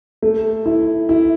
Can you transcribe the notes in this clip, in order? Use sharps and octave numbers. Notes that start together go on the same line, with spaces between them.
A3
E4
E4